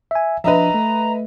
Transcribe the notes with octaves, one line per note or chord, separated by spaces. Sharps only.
E5 G#5
F3 D4 B4 D#5 E5 A#5
A3